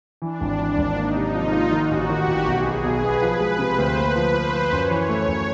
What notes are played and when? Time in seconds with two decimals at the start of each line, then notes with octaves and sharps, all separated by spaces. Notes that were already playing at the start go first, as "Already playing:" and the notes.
0.22 E3 D4
0.41 G#1
0.59 E3 D4
0.78 G#1
0.96 A#3 D#4
1.16 C3
1.34 F3 F4
1.52 A#3
1.71 D#3 F#4
1.91 A1
2.09 D#3 G4
2.28 A1
2.46 B1 G#4
2.66 B3
2.84 B1 B4
3.04 B3
3.22 F3
3.40 G#3
3.59 C3 C5
3.78 D2
3.97 A#3 B4
4.16 F3
4.34 F3 C5
4.53 F3
4.71 F#2 C#5
4.91 E3
5.09 A3 C#5
5.28 F#2